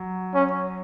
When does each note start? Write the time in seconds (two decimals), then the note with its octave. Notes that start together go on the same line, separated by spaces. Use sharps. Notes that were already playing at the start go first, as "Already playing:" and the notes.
Already playing: F#3
0.35 C#4